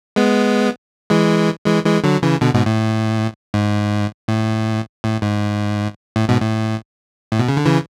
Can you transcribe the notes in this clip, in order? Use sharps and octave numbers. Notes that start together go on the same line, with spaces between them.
G#3 B3
E3 G#3
E3 G#3
E3 G#3
D3 F#3
C#3 E3
B2 D3
G#2 B2
A2
G#2
A2
A2
G#2
A2
G#2 B2
A2
A2
B2
C#3
D3
C#3 E3